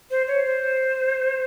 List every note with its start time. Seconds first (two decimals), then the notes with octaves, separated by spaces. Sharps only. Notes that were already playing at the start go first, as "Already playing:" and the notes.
0.11 C5
0.28 C#5
0.45 C5